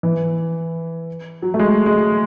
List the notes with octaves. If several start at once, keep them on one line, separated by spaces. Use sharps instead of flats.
E3
F#3
A3
G#3
G#3